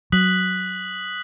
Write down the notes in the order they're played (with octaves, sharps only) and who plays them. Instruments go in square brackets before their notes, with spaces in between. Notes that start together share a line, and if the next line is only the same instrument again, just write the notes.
[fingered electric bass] F#3 [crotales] D#6 F#6 B6 F#7